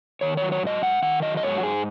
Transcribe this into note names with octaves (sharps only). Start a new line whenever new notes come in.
D#3 C#5
F#3 C#5
C#5
G#2 D#5
G#2 F#5
D#3 F#5
F#3 D#5
D#5
G#2 C#5
F#4
G#2 G#4